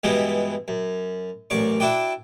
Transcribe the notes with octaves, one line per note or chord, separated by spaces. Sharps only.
G2 B2 E3 G#3 B3
F#2
A1 F#2 D5 C#6
D4 E4 F#4 D5 G5